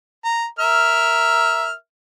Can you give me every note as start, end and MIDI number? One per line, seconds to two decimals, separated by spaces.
0.25 0.46 82
0.59 1.74 70
0.59 1.74 76
0.59 1.74 89